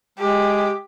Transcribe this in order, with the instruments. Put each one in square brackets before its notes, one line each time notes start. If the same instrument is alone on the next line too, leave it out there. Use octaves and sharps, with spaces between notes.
[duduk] G#3 [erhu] G4